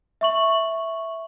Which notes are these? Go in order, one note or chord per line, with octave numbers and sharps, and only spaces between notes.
E5 C#6 F#7